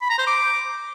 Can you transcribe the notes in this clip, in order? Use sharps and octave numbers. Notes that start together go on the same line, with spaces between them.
B5
A#5
C5
D6